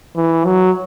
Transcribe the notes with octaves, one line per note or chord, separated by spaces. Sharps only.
E3
F#3